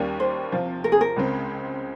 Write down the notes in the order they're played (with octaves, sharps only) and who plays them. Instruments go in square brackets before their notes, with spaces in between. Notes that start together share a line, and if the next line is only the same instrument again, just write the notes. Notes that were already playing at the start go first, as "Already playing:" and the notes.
Already playing: [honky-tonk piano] D#2 D#3 G3 A#3 C#4
[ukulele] C5
[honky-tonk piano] C3 F3 C4 F4
[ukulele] A#4
G#4
A#4
[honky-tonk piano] C#2 C#3 G#3 C4